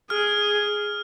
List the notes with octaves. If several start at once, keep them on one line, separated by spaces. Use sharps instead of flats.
G#4 F6